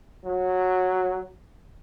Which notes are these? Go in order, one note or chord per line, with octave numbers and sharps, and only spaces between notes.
F#3